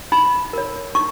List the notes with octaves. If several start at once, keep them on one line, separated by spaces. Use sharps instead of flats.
D#4 B5
A#4 C#5
D#4 C#6